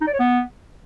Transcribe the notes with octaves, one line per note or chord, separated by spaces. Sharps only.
D#4
D5
C#5
B3